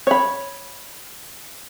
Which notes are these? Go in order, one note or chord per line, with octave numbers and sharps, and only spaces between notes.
C#5 B5